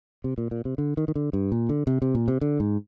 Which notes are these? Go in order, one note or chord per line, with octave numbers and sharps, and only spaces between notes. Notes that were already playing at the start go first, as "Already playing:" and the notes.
C3
A#2
A#2
C3
D3
D#3
D#3
D3
G2
A#2
D3
C3
C3
A#2
C3
D3
G#2